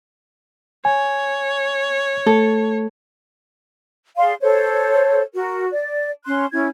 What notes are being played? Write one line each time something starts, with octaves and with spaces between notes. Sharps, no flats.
C#5 G#5
A3 A4
G#4 D5 F5 C6
A4 C5 C#5
F#4 A#4
D5
C#4 C6 F#6
C#4 E4 G#6